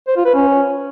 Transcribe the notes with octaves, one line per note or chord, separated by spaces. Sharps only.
C5
F4
B4
C#4